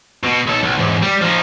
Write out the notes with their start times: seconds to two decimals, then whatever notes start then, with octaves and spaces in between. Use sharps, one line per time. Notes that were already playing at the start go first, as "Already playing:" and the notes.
0.23 B2
0.47 B1 A4
0.63 B1
0.78 E2 G#2
1.02 G3
1.21 F3 D#4